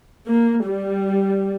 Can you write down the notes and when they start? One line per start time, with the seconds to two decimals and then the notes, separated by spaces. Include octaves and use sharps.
0.26 A#3
0.67 G3